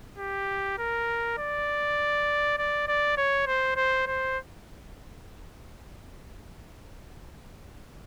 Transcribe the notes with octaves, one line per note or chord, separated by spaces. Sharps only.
G4
A#4
D5
D5
D5
C#5
C5
C5
C5